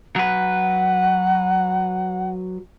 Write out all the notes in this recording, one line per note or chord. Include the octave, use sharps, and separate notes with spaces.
F#3 B4 F#5